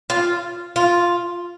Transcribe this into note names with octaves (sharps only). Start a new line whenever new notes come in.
F4
F4